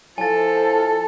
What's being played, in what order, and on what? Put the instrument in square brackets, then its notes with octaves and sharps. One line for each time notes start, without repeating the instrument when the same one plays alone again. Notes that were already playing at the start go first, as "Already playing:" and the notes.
[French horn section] F3 E4 [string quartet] A4 [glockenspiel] G#5 A6